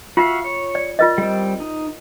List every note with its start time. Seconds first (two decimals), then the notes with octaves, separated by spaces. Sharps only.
0.17 F4 F#4 E5 F5
0.44 C#5
0.75 D5
0.99 F4 A#4 D#5
1.18 G3 C4
1.60 D#4